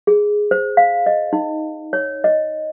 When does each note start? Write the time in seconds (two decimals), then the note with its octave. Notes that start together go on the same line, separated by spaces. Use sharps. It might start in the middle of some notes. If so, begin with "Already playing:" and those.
0.07 G#4
0.51 C5
0.77 F5
1.06 D#5
1.33 D#4
1.93 C#5
2.24 D#5